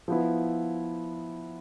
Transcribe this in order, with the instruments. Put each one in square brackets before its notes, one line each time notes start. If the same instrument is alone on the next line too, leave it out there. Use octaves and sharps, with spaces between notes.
[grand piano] F3 B3 E4